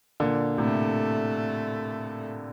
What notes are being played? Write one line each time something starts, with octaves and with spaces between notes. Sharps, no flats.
A#2 D3
A2 C3 A3